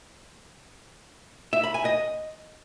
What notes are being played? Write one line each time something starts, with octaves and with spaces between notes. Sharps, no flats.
E5
B5
G#5
D#5